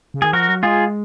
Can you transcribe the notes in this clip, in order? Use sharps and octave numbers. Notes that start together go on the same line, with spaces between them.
C#3
D#3 G#4
F3 F#4 A#4
F#3
G#3 F4 G#4